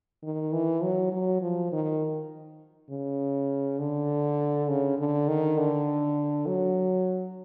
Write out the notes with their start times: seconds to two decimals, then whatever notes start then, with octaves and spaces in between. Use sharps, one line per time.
0.24 D#3
0.53 E3
0.83 F#3
1.12 F#3
1.42 F3
1.72 D#3
2.90 C#3
3.79 D3
4.69 C#3
4.98 D3
5.28 D#3
5.58 D3
6.47 F#3